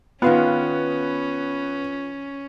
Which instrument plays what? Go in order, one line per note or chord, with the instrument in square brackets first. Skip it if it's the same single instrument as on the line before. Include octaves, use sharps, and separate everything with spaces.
[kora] D#3 F5 F#5 [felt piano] B3 [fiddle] C#4 [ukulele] F4